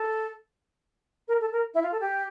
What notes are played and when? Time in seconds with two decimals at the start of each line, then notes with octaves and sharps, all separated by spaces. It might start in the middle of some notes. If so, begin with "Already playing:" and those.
Already playing: A4
1.28 A#4
1.40 A4
1.52 A#4
1.74 E4
1.82 F4
1.91 A4
2.00 G4